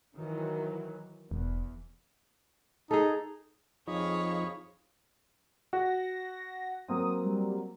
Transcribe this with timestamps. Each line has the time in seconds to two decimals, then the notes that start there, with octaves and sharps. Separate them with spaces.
0.17 D#3 E3 F#3
1.31 E1 E2
2.91 D#4 G#4 A4
3.88 F2 F3 D#4 G#4 C#5 F5 B5 C#6
5.73 F#4 A#6
6.88 F#3 A#3 C4 D#6
7.24 G3